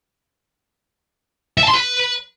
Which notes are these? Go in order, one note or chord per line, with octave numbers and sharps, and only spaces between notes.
E5
A5
C6
B4